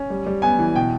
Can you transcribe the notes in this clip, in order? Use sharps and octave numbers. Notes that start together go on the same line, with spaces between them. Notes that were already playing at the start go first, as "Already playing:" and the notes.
Already playing: C#4
G3
G3
B3 G#5
E3
B2 G5